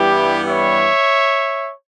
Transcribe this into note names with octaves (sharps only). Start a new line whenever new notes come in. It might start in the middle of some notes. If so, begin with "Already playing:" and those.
Already playing: G2 E3 G3 B3 E4 G4
C#5 E5